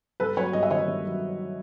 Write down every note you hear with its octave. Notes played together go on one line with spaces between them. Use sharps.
G2 A4 B4
F#3 B4 C#5
G2 D#5
E5
D#3 C#5 D#5
G2
F#3